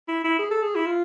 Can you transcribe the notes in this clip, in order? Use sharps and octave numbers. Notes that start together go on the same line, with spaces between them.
E4
E4
G#4
A4
G#4
E4
F4